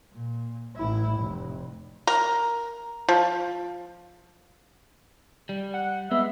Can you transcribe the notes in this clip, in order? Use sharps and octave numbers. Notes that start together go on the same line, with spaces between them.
A#2
A1 E4
F1
A#4
F3
G3
F#5
G#3 B3 E5